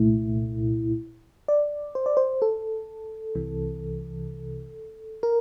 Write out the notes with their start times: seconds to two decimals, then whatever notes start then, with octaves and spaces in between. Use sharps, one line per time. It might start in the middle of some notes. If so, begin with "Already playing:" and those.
Already playing: C2 A#2 A3 E4
1.48 D5
1.95 C5
2.06 D5
2.17 C5
2.42 A4
3.35 C2 C3 E3
5.23 A#4